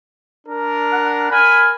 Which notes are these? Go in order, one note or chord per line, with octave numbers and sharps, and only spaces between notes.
D4 A#4
F#5
A#4 G#5 B5